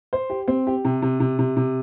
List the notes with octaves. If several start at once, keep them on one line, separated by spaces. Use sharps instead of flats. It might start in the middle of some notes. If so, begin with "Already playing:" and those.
C5
G4
C4
G4
C3
C3
C3
C3
C3